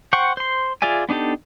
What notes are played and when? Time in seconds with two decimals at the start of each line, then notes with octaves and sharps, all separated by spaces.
0.13 C5 F#5 G5 C#6
0.37 C5 C6
0.82 F4 G#4 D5 E5 G#5
1.09 B3 D4 D#4 G4 A4